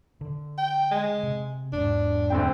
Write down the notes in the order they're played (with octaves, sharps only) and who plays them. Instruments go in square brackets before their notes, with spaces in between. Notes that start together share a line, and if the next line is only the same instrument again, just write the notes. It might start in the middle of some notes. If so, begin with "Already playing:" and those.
[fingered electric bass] D3
[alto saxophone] G5
G#3
[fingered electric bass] C3
[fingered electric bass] E1 G#2 [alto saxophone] D4
[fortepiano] D2 C4 G5